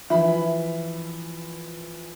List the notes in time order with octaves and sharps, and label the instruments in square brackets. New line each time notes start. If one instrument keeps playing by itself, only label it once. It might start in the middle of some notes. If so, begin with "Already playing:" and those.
[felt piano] E3 F3 B5 [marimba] E5